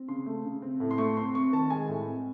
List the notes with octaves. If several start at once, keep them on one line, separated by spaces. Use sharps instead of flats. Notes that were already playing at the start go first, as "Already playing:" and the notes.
Already playing: C4
C#3 C6
A3
C#3
C4
A2
C6
A3 C#6
C4 C6
C4 C#6
D#3 A5
G#3 G#5
A2
C4